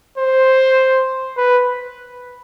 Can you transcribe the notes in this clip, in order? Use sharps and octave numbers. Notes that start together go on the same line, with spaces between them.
C5
B4